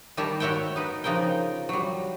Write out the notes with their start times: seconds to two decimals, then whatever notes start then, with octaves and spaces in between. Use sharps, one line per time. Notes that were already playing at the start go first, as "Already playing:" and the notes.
0.17 D#3 G3 E4 G4 A#4 A5
0.40 F#4 C#5 E5 F#5 G5
0.76 D#4 B4
1.04 C#3 F3 D#4 A#4 G5
1.69 F#3 G3